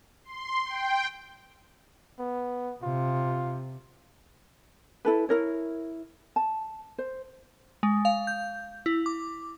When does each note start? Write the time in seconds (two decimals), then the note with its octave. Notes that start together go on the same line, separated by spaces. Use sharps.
0.24 C6
0.65 G5
2.19 B3
2.83 C3 F4
5.05 E4 A4 B4
5.29 E4 A#4 C#5
6.36 A5
6.98 C5
7.83 G#3
8.05 F5
8.27 G6
8.86 E4
9.06 D6